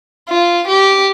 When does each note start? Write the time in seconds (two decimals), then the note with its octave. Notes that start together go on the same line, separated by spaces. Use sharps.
0.29 F4
0.67 G4